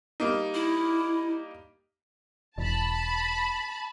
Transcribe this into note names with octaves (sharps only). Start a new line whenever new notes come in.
G3 A#3 D#4
E4
E1 A5 B5